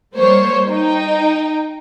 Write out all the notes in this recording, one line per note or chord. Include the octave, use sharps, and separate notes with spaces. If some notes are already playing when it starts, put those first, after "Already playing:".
G3 A#3 C5 C#5
D#4 G5